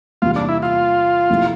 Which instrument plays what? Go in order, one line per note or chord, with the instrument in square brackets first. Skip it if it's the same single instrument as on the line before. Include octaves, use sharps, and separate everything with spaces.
[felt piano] E2 C3 G3 A#3 [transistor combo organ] F4
[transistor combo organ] D4
E4
F4
[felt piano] C3 F3 A3 E4